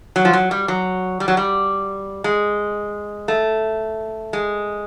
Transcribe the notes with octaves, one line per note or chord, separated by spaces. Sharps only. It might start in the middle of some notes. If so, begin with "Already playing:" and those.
F#3
F3
F#3
G3
F#3
G3
F#3
G3
G#3
A3
G#3